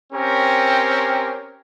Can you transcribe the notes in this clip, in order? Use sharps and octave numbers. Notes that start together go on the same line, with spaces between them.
C4 C#4 G4 A#4